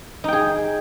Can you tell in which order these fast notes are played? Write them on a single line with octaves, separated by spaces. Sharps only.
D#4 G5 G#4